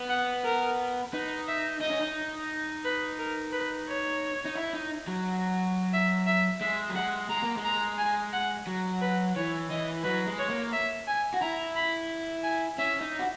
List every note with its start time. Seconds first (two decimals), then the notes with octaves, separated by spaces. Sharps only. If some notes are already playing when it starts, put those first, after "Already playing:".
Already playing: B3
0.10 F#5
0.44 A#4
1.13 D#4 B4
1.48 E5
1.81 D#4 D#5
1.91 C#4
2.01 D#4
2.85 B4
3.19 A#4
3.52 B4
3.88 C#5
4.45 D#4
4.55 E4
4.73 D#4
5.07 F#3
5.93 E5
6.27 E5
6.61 G#3 E5
6.89 F#3
6.95 G#3 F#5
7.29 G#3 A#5
7.43 A#3
7.57 G#3
7.65 A#5
7.98 G#5
8.33 F#5
8.67 F#3
9.01 B4
9.36 E3 C#5
9.71 E3 D#5
10.04 F#3 B4
10.27 G#3
10.39 C#5
10.49 A#3
10.72 E5
11.07 G#5
11.34 F#4
11.41 E4 A#5
11.76 B5
12.44 G#5
12.78 C#4 E5
13.01 D#4
13.19 F#4